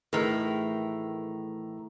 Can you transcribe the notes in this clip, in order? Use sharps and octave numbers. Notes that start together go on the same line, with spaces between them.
A2 D#3 E3 A3 G#4 A#4 A#5